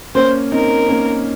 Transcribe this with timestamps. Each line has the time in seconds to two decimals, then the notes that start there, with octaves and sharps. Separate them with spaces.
0.15 A#3 C#4 C5
0.52 C4 D#4 A#4
0.88 A#3 C#4